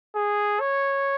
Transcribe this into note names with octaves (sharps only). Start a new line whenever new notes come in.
G#4
C#5